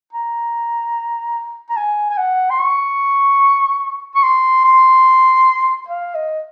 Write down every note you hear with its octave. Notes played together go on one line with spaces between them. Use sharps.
A#5
A#5
G#5
G#5
F#5
C6
C#6
C#6
C6
C6
F5
D#5